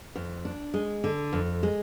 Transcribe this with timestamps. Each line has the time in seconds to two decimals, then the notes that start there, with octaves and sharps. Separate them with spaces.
0.16 F2
0.45 D4
0.74 G#3
1.04 D3
1.33 F2
1.63 G#3